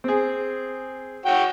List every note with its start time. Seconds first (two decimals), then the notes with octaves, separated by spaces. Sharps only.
0.04 C4 G#4
1.26 F#4 C#5 G5